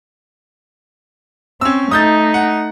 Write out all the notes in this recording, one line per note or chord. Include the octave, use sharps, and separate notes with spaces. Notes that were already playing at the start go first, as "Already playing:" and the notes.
C4 C#4 E6
A3 D#4 D#6 G6 A6
F#5